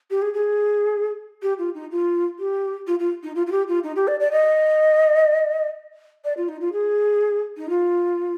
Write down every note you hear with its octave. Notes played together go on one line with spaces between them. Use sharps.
G4
G#4
G#4
G4
F4
D#4
F4
G4
F4
F4
D#4
F4
F4
G4
F4
D#4
G4
D5
D5
D#5
D5
F4
D#4
F4
G#4
D#4
F4